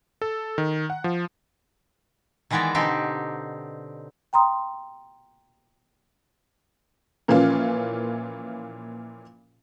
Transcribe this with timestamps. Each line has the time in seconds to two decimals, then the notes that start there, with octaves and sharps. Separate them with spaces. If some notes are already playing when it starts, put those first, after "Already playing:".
0.22 A4
0.58 D#3
0.90 F#5
1.04 F3
2.51 D#3 E3 G#3 B3 D5 A#5
2.75 B2 D3 C4 D#4 G4
4.33 G5 A#5 C6 D#6
7.28 A#2 E3 F3 A#3 C#4 F4